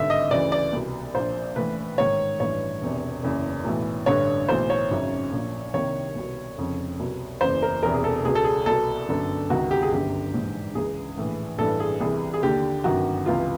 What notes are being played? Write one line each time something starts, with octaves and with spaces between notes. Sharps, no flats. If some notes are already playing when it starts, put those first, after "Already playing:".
Already playing: G#1 G2 D3 E5
D#5
D2 C#3 E3 D5
D5
C2 B2
A#1 A#2 C5
A1 A2 E3 B4
A1 G#2 D#3 C#5
A1 G2 E3 C#5
E1 E2 C3
F#1 E2 C#3 E3
B1 A2 E3
A1 G2 D3 C#5
B1 A2 E3 C5
C#5
G#1 F#2 C#3
A#1 A#2
C2 C3 D#3 C#5
C2 B2
F1 F2 C#3
C2 B2
F#1 E2 C#3 E3 C5
A#4
E1 E2 C3 E3 A#4
G#4
A4
C#2 B2 G#4
A4
G#4
C2 B2 A4
G1 F#2 D3
C#2 C3 D#3 F#4
G4
G#4
G1 F#2 D3 G4
A#1 G#2 E3
C#2 C#3 E3 G#4
A#1 A2 E3
A1 G2 E3 A4
G#4
C2 C3 E3 G#4
G#4
D#2 D3 G4
G1 F#2 D#3 F#4
C#2 C3 E3 F4